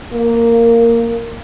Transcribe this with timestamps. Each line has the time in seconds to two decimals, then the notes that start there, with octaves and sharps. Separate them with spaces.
0.13 A#3